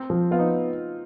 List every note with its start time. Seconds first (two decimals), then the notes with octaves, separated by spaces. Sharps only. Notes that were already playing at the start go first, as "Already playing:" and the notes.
Already playing: C4
0.10 F3
0.31 B3 F4
0.39 D#4